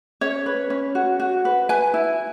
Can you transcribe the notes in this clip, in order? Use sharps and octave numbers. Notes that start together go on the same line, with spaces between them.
C#4 C#5
B4
C#4
F#4
F#4
B4
B4 G#5
E4